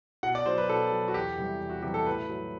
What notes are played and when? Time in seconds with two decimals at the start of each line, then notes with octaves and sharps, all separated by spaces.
0.23 B2 F#5
0.35 D5
0.46 F#3 C5
0.58 B4
0.69 B2 A4
0.92 F#3
1.08 F#4
1.14 E2 G4
1.38 C3 E3 G3
1.61 E2
1.70 F#4
1.82 C3 E3 G3 G4
1.94 A4
2.06 A2 B4
2.30 F#3